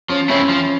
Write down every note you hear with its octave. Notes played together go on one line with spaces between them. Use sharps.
F3 C#4
A3 C4 C#4 E4
F3